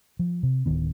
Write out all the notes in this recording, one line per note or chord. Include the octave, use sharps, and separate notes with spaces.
F3
C3
D1 D#3 B3